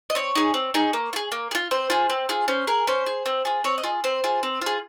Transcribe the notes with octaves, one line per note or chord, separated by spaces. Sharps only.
D#5
C4 C#5
D#4 G#4
C4
D#4 G#4
A#3
F4
G#4
A#3
G#4
F4
C4 C5
F4 G#4
C4
F4 G#4
C#4 C5
G#4 A#4
C#4 C5
G#4
C4
F4 G#4
C4 C#5
D#5
F4 G#4
C4 C5
F4 G#4
C4
F4 G#4